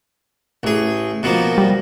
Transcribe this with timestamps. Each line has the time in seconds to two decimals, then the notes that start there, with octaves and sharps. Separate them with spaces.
0.63 A1 G#4
1.23 B2 F3 A#3
1.58 G3